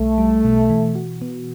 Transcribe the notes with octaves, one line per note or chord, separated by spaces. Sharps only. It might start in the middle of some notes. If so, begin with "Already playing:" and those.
Already playing: B1 G3 A3
G3
B2
E3
F#4
B3